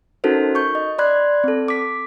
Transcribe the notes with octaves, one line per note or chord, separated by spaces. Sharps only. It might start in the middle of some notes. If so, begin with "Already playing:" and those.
C#4 D#4 F#4 A4 A#4 C5
C#6 G6
D#5
D5 B5 C6 F#6 G#6
C4 A4
D6 B6